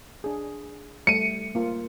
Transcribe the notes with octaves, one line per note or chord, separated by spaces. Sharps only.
D4 G#4
G3 A3 C#7 D#7
A#3 F4